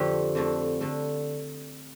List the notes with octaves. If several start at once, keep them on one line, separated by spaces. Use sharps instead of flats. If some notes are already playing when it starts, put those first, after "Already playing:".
Already playing: F2 D3 A3 C4 D4 G4
F2 D3 A3
D3 A3